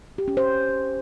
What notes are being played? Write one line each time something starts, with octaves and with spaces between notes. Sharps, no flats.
G4
C#4
C5